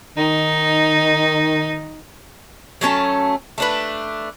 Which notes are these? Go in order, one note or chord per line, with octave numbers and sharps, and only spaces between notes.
D#3 D#4
F#3 A3 C#4 A5
A3 D4 B4